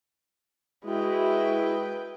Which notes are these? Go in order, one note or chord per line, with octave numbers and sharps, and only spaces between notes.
G#3 E4 F#4 B4 G5